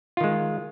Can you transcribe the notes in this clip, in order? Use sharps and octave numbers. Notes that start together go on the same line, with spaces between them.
D#3 G#3 F4